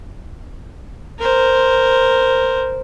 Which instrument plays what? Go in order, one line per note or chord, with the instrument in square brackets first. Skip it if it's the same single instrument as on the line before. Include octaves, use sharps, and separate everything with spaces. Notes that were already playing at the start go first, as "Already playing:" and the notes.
[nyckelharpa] A#4 C5